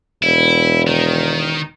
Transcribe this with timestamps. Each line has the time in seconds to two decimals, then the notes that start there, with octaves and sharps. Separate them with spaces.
0.23 E1 E4
0.87 D#3